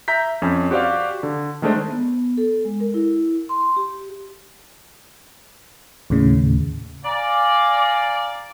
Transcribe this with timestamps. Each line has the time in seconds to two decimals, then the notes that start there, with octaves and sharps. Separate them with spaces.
0.08 E5 A#5 G6 B6
0.42 F2 C#4
0.71 F#4 G4 C5 D5 F5
1.23 D3
1.62 D#3 G#3 A3 D4 C5
1.90 B3
2.38 A4
2.65 G#3
2.80 A#4
2.94 E4
3.49 C6
3.76 G4
6.10 D#2 A2 C#3
7.04 D5 F5 G#5 A#5